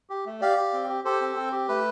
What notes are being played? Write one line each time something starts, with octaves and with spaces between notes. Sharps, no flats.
G4
A3
G4 D5 F5
G4
C4
G4
G4 A4 C5
C4
C4
G4
A3 B4